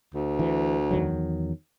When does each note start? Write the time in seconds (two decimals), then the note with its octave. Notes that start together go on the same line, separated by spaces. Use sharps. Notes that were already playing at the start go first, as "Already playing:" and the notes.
0.14 D2
0.39 E3
0.91 E2 D#3 F#3